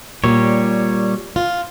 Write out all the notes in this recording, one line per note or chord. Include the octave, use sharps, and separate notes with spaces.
A#2 G3 C#5
F4